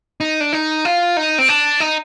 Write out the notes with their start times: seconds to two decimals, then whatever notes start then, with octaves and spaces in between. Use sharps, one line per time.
0.20 D#4
0.41 D4
0.53 D#4
0.85 F4
1.17 D#4
1.38 C4
1.49 D4
1.80 D#4